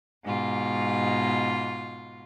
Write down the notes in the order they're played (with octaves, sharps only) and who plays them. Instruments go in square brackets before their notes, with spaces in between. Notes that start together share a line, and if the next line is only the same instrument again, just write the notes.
[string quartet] G#2 B2 F4